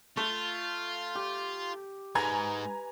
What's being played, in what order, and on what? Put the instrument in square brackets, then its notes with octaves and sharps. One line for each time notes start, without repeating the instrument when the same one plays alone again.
[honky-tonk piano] A3 [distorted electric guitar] F4
[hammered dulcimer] G4
[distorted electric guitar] G#2 G#3 [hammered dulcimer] B4 [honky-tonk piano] G#5 A#5 G#6